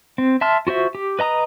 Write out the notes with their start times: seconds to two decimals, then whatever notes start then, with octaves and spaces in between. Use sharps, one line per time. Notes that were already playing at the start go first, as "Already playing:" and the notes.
0.18 C4
0.41 E5 A5 C6 F6
0.67 F4 F#4 C5 E5
0.95 G4
1.19 B4 D#5 A#5 D#6